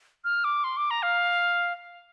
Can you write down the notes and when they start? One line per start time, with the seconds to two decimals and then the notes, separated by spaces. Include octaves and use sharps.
0.25 F6
0.44 D6
0.64 C6
0.77 D6
0.91 A#5
1.03 F5